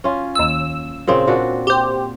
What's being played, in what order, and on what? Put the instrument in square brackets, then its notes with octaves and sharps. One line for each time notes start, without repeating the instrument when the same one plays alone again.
[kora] C#4 F4
[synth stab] D#2 E6
[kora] A#2 C#3 C4
A#2 D4 F#4
[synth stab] G4 C5